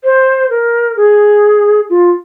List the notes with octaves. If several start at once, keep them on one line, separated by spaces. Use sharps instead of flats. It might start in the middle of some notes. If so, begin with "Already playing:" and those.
C5
A#4
G#4
F4